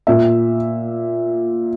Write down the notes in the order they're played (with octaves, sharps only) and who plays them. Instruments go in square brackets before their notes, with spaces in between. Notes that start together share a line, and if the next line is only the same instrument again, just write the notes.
[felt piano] A#2 E5